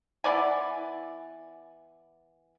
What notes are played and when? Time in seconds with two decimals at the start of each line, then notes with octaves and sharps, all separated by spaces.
0.24 E3 B3 D5 G#5